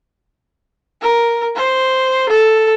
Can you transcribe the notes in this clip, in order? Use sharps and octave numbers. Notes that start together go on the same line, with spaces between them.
A#4
C5
A4